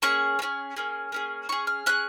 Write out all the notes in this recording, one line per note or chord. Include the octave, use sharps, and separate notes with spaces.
A#3 C#4 G#4 C#6
A#3
C#4 G#4
A#3 C#4 G#4
A#3 C#4 G#4
C#4 G#4 C#6
F6
C#4 G#4 F#6